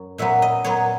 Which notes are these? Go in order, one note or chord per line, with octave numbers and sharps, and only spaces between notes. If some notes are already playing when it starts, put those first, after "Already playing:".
Already playing: F#2
A#2 F#3 B3 E5
D#5
A#2 F#3 B3 C#5